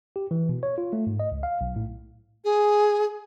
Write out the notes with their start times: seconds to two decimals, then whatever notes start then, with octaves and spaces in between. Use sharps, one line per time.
0.16 G4
0.31 E3
0.49 B2
0.63 C#5
0.78 F4
0.93 A3
1.07 G#2
1.20 D#5
1.32 C#2
1.43 F5
1.61 B1
1.76 A2
2.45 G#4